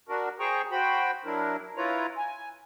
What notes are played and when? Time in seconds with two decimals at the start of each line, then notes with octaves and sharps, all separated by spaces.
0.09 D4 F#4 A#4
0.40 G#4 C5 G5 A#5 C#6
0.71 F#4 C5 G5 B5
1.25 F#3 D4 E4 A#4
1.77 E4 F4 B4 C#5 A#5
2.17 G#5